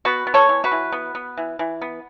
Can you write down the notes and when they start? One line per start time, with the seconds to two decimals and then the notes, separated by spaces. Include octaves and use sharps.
0.05 B3 F#4 B4
0.27 B3
0.34 A4 C#5
0.49 E3
0.64 F#4 B4
0.71 E3
0.92 B3
1.15 B3
1.37 E3
1.59 E3
1.81 B3